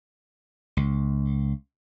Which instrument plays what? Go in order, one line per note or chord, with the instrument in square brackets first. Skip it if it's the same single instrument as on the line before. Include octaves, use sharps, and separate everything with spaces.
[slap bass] C#2